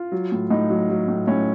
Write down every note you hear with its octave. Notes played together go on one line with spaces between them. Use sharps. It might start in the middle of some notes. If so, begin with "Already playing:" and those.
Already playing: F4
F#3
A2
A2 D#4
F#3
F#3
A2
A2 C#4